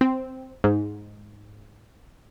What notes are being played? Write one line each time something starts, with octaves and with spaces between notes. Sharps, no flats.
C4
G#2